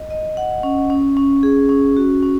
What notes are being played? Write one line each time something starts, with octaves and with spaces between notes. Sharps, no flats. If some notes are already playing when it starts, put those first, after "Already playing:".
Already playing: D#5
D#5
F#5
C#4
C#4
C#4
G#4
C#4
F#4
C#4